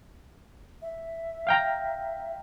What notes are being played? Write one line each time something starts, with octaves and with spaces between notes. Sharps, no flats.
E5
F5 G5 A#5